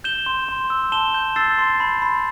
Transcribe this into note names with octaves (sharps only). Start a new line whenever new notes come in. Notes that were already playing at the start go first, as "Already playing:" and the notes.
G6 E7 G7
C6
C6
E6
A5 E7 G7
G6
E6 A6 C7
C6
B5
B5